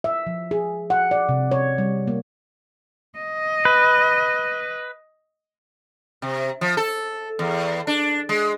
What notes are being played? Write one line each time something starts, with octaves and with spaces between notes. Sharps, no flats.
E5
F3
G#4
F#5
D5
C3
C#5
G3
A#3
D#5
B4
C3
F3
A4
E2
D4
G#3